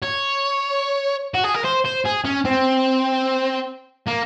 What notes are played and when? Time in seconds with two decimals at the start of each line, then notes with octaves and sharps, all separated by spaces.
0.03 C#5
1.34 F#4
1.44 G#4
1.54 A#4
1.64 C5
1.85 C5
2.05 G#4
2.25 C#4
2.45 C4
4.07 A#3